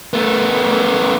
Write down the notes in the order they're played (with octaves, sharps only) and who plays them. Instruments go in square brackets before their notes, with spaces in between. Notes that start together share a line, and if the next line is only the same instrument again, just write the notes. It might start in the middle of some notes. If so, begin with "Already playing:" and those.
[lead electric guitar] A3 B3